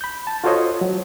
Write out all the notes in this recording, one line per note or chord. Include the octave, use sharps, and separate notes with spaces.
B5 G6
A5
F4 F#4 A4 C5 C#5 D#5
F#3